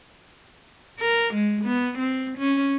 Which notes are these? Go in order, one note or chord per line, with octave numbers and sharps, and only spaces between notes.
A#4
G#3
B3
C4
C#4